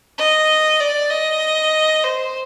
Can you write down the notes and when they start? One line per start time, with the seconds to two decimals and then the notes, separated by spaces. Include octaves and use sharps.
0.18 D#5
0.80 D5
1.11 D#5
2.04 C5